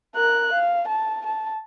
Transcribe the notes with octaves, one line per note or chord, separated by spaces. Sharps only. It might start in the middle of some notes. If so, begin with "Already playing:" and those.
A#4 F#6
F5
A5
A5